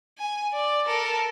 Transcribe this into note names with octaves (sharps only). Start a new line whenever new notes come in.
G#5
D5
A4 A#4